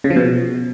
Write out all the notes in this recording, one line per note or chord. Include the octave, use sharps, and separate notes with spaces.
C#3
F3
B2